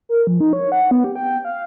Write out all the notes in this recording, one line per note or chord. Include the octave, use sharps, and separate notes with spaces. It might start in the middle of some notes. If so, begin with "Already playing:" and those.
A#4
F3
D#4
C#5
F#5
B3
G4
G5
F5